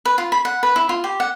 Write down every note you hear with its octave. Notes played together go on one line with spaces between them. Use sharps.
B4
F4
B5
F#5
B4
E4
F4
G4
F#5